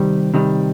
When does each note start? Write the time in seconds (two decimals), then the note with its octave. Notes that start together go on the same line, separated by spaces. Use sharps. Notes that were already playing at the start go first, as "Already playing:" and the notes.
Already playing: C3 D#3 G3
0.34 C3 D#3 G3